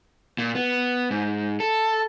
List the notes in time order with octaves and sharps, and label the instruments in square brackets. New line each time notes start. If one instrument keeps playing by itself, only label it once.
[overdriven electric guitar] A#2
B3
G#2
A4